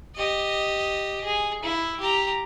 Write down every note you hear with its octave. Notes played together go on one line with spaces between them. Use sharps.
G4 D#5
G#4
E4
G4 A#5